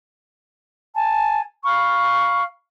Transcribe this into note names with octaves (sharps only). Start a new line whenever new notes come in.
G#5 A5
F5 B5 C#6 F6